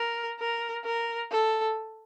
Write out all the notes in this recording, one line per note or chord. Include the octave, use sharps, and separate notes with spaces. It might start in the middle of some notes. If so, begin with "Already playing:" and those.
Already playing: A#4
A#4
A#4
A4